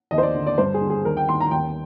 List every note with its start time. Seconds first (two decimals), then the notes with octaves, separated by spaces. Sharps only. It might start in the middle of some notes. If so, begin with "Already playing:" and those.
0.11 D#2 D#5
0.18 C5
0.23 D5
0.34 D3
0.46 D5
0.58 G2 C5
0.74 G#4
0.81 D3
0.90 G#4
1.05 D#2 A#4
1.17 G5
1.28 D#3 C6
1.40 A#5
1.51 D#2 G5